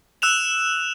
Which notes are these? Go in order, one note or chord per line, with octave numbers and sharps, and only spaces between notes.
E6 F#6 E7 F7